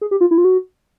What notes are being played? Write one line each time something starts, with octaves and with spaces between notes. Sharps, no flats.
G#4
G4
F4
E4
F4
F#4